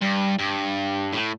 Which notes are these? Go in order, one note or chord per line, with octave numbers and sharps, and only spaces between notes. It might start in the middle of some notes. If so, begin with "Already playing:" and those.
G2
G2
A2